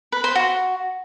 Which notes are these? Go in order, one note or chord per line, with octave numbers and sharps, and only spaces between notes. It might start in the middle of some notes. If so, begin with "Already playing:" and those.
B4
C5
F#4